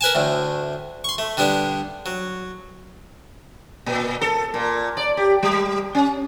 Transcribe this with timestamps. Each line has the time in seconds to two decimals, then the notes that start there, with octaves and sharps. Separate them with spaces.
0.01 A#4 B4 G#5 A5
0.15 D2 A2 D3
1.04 C6 C#6
1.18 A3
1.37 D3 G3 B3 D4
2.06 F#3
3.86 A#2
4.21 A4
4.54 A#2
4.97 D5
5.17 G4
5.43 G3
5.95 C#4